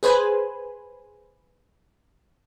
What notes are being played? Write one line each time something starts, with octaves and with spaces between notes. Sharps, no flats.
G#4 B4 C5 G#5